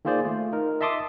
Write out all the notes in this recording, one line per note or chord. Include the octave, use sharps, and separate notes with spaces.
D#3 A#3 F4 G#4 C5 D5
A3 F4
D#4 A#4
D#5 E5 A5 C6 D6 D#6